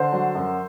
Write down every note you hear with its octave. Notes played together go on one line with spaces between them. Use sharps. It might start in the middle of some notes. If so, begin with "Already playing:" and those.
Already playing: D3 C5
F#3
F#2